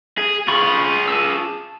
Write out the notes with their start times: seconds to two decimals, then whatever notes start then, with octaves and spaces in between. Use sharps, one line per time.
0.18 G#4
0.48 F4 G#4 B5 C#6
1.08 A5 E6